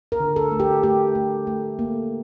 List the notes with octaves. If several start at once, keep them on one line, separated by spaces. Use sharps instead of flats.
A#4
D3
A4
A3
G4
A3 G4
A3
A3
A#3